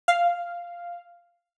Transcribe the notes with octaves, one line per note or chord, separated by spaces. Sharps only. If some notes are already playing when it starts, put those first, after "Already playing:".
F5